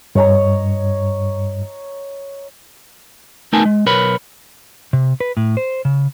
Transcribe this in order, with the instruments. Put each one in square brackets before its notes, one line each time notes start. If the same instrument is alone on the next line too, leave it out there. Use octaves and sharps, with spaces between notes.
[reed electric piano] G2 [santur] C#5 D#5 A#5
[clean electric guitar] A3 B3 D#4 A#4 G#5 A5
G#3
B1 A#4 B4 C#5 B5
[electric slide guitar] C3
B4
A2
C5
C#3